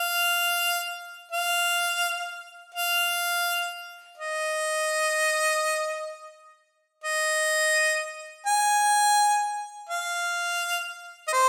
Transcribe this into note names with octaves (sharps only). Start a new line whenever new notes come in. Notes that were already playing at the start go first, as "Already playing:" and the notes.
Already playing: F5
F5
F5
D#5
D#5
G#5
F5
D#5
C5